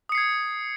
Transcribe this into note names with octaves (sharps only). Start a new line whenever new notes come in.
D#6 G#6 C7 C#7